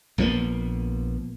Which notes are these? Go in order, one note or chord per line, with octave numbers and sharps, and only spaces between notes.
A#1 F3 A#3 B3